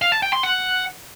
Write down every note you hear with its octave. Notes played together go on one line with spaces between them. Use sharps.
F5
A5
G5
C6
F#5